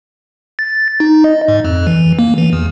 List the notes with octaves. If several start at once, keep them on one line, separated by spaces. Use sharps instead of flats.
A6
D#4
D#5
G#2
F2
E3
A#3
E3
E2